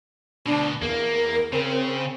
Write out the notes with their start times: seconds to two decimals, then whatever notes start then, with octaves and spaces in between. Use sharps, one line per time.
0.46 D2 B2 D4
0.82 E2 A#3 A#4
1.53 C#3 C4